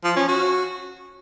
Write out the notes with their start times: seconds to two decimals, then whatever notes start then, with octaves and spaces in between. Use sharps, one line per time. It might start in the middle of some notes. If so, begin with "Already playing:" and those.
0.04 F3
0.16 C#4
0.28 F#4